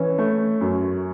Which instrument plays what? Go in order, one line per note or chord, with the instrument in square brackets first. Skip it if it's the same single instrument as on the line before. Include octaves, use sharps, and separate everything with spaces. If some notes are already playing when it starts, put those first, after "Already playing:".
Already playing: [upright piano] E3 C#4
A3
F#2